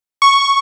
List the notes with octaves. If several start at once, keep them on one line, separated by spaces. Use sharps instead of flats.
C#6